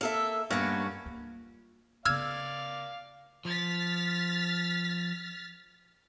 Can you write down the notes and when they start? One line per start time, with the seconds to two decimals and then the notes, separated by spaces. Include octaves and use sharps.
0.01 A#3 A4 E5
0.50 G2 A#3 B3 C#4 F#4
1.06 A#3 F4
2.05 C#3 B3 D5 F5 E6 F6 G#6
3.45 F3 F6 A6 B6